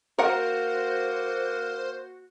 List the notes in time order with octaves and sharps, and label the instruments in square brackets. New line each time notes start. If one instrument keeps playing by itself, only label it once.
[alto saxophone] A#3 [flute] F#4 [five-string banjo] A#4 F#5 [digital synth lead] C5